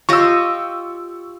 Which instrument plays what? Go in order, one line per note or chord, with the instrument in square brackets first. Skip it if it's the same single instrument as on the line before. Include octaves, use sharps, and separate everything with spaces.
[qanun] F4 G4 D#5 [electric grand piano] C#6 E6